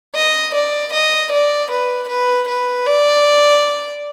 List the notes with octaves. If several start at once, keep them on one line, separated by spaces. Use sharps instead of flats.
D#5
D5
D#5
D5
B4
B4
B4
D5